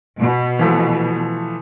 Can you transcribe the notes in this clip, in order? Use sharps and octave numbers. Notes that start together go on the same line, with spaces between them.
B2
E3 F3 A3